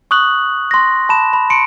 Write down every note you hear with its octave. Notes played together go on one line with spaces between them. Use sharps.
C#6 D#6 F#6 F#7
C6 A#6
A5 B5 E7
B5
C6 C#7 D7